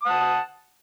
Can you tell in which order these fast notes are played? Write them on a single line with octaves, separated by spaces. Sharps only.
D#6 F#5 A5